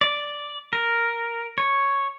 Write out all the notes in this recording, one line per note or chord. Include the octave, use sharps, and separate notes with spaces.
D5
A#4
C#5